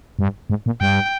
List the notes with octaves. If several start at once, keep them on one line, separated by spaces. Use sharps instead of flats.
G2
G#2
A#2
G2 G5